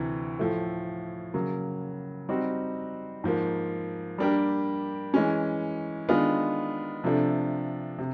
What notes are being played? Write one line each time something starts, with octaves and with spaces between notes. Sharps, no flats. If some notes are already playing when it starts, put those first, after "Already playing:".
Already playing: D2 C3 E3
A2 F3 A3
C#3 F#3 A#3
G3 C4 D#4 F#4
G#2 F3 A#3
G3 A#3 D4 G4 A#4
E3 G#3 C#4
D#3 G#3 B3 D4 F4
C3 F3 A3 D4
C3